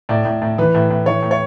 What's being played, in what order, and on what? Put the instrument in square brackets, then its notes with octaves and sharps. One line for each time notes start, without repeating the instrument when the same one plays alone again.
[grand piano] A2 D5
A2
A2
E3 B4
A2
A2
E3 C#5
A2
C#5